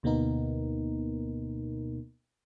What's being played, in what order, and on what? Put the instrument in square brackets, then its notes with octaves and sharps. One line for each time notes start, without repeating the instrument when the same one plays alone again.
[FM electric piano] D2 B2 A#3 B3 D#4 A#4